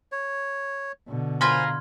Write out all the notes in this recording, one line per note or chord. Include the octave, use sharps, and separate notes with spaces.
C#5
B2 D3
F4 A#4 C5 G#5 B5 C6 F6 G#6